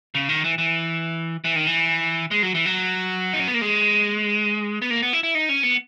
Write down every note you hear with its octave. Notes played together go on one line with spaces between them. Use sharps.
C#3
D#3
E3
E3
E3
D#3
E3
G#3
F#3
E3
F#3
D#4
C#4
B3
A#3
G#3
B3
A#3
B3
E4
E4
D#4
C#4
B3